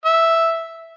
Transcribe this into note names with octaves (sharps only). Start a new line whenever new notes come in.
E5